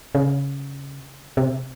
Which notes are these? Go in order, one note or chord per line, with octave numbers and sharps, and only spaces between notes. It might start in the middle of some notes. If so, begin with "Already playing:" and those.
C#3
C3